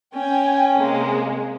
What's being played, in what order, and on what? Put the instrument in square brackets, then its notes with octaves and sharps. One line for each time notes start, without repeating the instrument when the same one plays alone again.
[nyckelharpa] C#4 [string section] G5 G#5
[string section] C3 G#3 A#3